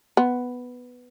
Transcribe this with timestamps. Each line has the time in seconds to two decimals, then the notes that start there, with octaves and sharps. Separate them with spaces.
0.17 B3